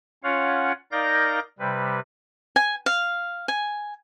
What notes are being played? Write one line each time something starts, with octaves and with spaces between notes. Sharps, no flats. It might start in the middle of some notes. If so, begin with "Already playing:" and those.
C#4 F4 C#5 F5 F#5
D#4 A#4 D5 F5 G6 A#6
C3 G3 B4
G#5
F5
G#5